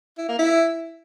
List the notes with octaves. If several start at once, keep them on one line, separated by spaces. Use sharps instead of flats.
E4
A#3
E4